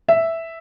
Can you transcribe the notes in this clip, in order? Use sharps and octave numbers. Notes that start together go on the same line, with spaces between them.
E5